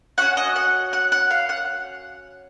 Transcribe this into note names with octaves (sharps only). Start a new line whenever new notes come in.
C#4 F#4 F#5
D#5
F#5
F#5
F#5
F5
F#5